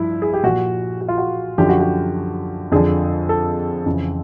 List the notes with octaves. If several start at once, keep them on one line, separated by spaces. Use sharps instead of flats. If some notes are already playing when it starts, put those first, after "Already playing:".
Already playing: G2 F3 E4
G#4
G4
A#2 F3 F#4
F#4
F4
F#4
F#2 D3 F3 G4
F#4
G4
F2 D3 F3 G#4
A4
F2 C#3 E3